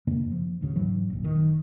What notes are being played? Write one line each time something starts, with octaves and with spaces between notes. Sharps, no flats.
F#2 C#3 A#3 D4
F3
G#1 D2 C#3
G#2 E3 F#3
D#1 A#1
F#1 D#3